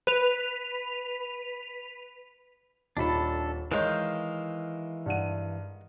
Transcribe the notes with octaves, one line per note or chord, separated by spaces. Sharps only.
B4 F7
D#1 D4 D#4 A4 B5
D#3 E3 G#3 C#5 F5 G6
G2 F#5 D#7